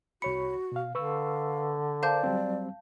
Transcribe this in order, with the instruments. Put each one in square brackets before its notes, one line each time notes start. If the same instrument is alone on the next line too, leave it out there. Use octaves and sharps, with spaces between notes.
[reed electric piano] C2 C#5 B5 [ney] F#4 [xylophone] C#7
[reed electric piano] B2 F5
[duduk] D3 [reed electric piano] B4 C#6 E6 [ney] F5
[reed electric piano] A#4 C5 D6 [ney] D5 [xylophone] F5 A5 G6
[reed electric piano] F#3 G3 C4